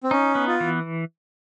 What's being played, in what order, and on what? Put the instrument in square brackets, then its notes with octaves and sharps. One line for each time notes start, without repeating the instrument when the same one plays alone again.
[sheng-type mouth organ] C4
[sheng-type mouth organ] C#4 [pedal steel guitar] D#4
[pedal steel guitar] B3
[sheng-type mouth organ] F4
[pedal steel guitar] E3